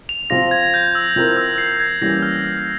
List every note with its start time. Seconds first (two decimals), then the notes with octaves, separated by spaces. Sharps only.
0.09 F7
0.30 F3 C4 F4 A#6
0.51 G#6
0.74 G6
0.95 E6
1.16 F3 C4 E4 A#4
1.37 E6
1.58 C7
1.80 G#6
2.01 E3 G3 A#3 C#4 A#6
2.22 F6
2.44 F6